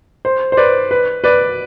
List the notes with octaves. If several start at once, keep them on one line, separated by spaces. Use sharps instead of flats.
C5
C5
B4 D5
B4
B4 D5